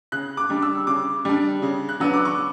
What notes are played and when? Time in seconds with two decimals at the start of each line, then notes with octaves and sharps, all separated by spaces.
0.12 C#3 F#6
0.37 D6
0.50 G3 D4
0.62 E6
0.87 C#3 D6
1.25 G3 D4
1.62 C#3
1.89 F#6
2.00 F#3 B3 D4 E6
2.14 D6
2.25 C#6